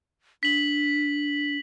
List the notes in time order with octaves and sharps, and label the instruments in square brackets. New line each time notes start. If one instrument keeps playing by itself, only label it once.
[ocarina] D4 [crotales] B6 F#7